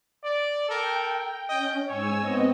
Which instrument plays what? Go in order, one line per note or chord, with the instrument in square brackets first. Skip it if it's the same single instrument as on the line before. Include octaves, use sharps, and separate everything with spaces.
[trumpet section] D5
[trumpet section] A4 A#4 [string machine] G5
[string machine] C#4 [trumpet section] D#5 G5
[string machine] G#2 G#5 E6 [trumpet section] C#5
[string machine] B3 C4 D#5